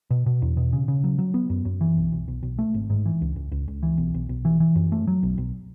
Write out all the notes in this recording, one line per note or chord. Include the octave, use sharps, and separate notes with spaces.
B2
B2
E2
B2
C#3
C#3
F#3
F#3
B3
F#2
F#2
E3
B1
B1
B1
B1
A3
G#1
G#2
E3
C#2
C#2
C#2
C#2
E3
B1
B1
B1
E3
E3
F#2
A3
F#3
B1
B1